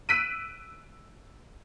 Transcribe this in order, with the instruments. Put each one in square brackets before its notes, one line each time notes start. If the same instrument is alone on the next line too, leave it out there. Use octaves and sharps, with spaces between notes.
[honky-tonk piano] E6 F#6 B6 D7 D#7